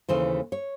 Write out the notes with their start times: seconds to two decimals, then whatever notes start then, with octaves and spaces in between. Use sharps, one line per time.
0.09 D#2 C#3 E3 A3 C5
0.52 C#5